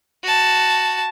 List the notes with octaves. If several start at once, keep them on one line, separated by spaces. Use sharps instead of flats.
F#4 A5